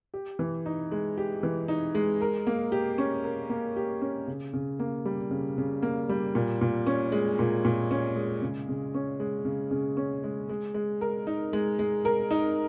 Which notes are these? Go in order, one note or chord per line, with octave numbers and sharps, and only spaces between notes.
G4
E3
D#4
G#3
G4
E3
D#4
G#3
A#4
A#3
G4
C#4
A#4
A#3
G4
C#4
C#3
C#3
A#3
G3
C#3
C#3
A#3
G3
A#2
A#2
C#4
G#3
A#2
A#2
C#4
G#3
C#3
C#3
C#4
G#3
C#3
C#3
C#4
G#3
G#3
G#3
A#4
D#4
G#3
G#3
A#4
D#4